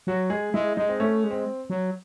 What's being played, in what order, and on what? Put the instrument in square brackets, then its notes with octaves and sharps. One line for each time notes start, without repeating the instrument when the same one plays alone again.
[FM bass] F#3 [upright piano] F#4
[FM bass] G#3 [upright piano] G#4
[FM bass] G#3 [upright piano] E4
[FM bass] G#3 [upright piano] D#4
[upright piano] C4
[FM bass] A3 [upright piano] C#4
[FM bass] G#3
[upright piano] C4
[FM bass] F#3